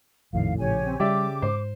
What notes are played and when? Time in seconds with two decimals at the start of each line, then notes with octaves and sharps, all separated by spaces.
0.33 A#1 F2 A2 D#3 F5
0.59 A#1 C#3 F3 G4 C#5 G#5
0.86 C4
1.00 C#3 G3 G4 D5 E5 D6
1.42 G#2 C5